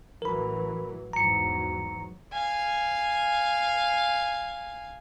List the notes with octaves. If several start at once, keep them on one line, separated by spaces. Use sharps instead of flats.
A1 E3 F#3 A#4 B5
E2 G#2 F#3 A#5 C#7
F5 G#5